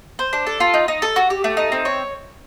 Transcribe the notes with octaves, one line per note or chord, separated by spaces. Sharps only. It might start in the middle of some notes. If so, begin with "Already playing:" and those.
C5
D4
A4
F4
D#4
D#4
A4
F#4
G4
A3
D#4
C4
C#5